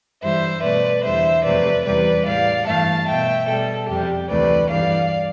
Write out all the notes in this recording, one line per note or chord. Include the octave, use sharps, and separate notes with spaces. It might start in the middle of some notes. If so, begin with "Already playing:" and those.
G2 E3 G3 C5 E5
B2 A3 B4 D5
E2 D3 G3 C5 E5
F2 C3 F3 A3 B4 D5
E2 C3 G3 B4 D5
A2 G3 D5 F5
G2 E3 A3 F5 A5
B2 A3 E5 G5
B2 G3 A4
F2 C3 G3 G4
D2 C3 E3 A3 B4 D5
G2 E3 G3 D5 F5